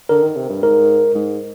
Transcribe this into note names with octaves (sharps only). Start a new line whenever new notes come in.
D3 A#4
D#3
C3
G2
G#2 A#4
G#2